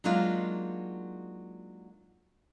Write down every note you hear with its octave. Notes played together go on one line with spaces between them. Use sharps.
F#3 G#3 A#3 D4 D#4 F4